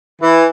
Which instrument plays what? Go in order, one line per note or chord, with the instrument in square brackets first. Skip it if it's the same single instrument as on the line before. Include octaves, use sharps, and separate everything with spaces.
[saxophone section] E3